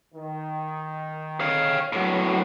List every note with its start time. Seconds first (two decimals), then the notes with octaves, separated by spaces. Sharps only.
0.15 D#3
1.41 C#5 F5
1.93 A2 F#3 B3 E4 A#4